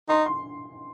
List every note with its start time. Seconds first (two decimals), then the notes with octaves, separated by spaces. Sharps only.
0.09 D#4 C6
0.26 C6